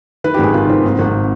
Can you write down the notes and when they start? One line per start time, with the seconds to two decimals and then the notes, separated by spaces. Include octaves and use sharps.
0.24 D#3 B4
0.34 G4
0.38 G#1
0.44 G#4
0.54 D#3 F4
0.69 D#3 C4
0.84 G#2
0.99 G#1